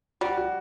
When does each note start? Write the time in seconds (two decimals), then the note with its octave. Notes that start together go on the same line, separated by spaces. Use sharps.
0.21 G3 F#4
0.37 F#4